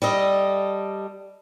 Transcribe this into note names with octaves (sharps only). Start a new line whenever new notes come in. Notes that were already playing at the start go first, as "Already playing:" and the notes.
G3 A4 D#5